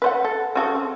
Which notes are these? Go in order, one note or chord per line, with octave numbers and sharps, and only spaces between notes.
B4 C5 F#5
A4
C#3 F#4 A4
C4